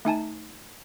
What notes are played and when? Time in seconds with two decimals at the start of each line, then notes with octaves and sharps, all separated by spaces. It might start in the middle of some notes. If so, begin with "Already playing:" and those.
0.05 A3 D#4 G#5 A5